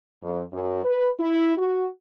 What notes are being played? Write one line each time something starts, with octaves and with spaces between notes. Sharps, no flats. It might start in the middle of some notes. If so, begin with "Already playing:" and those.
F2
F#2
B4
E4
F#4